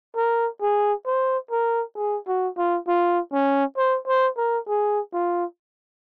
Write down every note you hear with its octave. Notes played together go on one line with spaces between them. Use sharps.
A#4
G#4
C5
A#4
G#4
F#4
F4
F4
C#4
C5
C5
A#4
G#4
F4